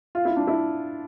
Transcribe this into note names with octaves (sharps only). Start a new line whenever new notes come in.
F4
E4
D4
E4